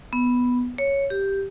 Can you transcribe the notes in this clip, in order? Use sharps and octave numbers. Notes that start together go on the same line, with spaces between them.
B3
C#5
G4